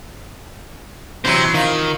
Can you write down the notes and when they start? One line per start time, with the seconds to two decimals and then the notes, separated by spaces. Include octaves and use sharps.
1.25 C3 E3 F#3 E4 C5
1.54 D#3 F4